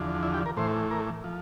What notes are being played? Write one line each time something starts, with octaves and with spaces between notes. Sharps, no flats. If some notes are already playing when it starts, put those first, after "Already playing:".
Already playing: E2 D3 F3
E4
G4
A#4
A2 E3 C5
A#4
F3